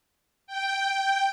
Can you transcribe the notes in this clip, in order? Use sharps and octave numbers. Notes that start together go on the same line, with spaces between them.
G5